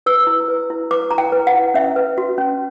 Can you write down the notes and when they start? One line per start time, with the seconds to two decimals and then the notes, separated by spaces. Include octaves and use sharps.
0.06 B4 E6
0.27 E4
0.48 B4
0.70 E4
0.91 B4 D6
1.11 E4 A#5
1.18 G5
1.32 B4
1.47 F#5
1.54 E4
1.74 C#4 E5
1.96 B4
2.18 F#4
2.38 C#4